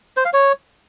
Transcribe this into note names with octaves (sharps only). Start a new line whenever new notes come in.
C5
F5
C#5